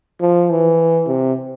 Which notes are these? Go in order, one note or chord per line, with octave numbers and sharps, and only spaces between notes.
F3
E3
C3